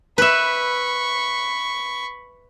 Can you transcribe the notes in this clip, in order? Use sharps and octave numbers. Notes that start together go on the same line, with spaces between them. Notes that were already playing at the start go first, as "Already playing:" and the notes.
B4 E5 B5 C#6